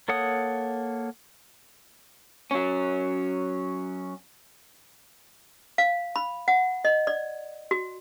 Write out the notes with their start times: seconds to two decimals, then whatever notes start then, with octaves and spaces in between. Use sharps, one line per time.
0.08 A#3 A4 C#5 F#5 D#6
2.51 F#3 C#4
5.78 F5
6.16 B5
6.48 F#5
6.85 D#5
7.07 D5
7.71 F#4